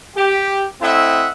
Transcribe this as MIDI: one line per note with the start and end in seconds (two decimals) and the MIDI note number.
0.16 0.64 67
0.81 1.28 45
0.81 1.28 60
0.81 1.28 64
0.81 1.28 75
0.81 1.28 76
0.81 1.28 78